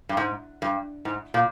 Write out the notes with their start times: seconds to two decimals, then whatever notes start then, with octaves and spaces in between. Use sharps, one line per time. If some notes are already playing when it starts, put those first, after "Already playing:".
0.09 G2
0.17 G#2
0.62 G2
1.05 G#2
1.34 A#2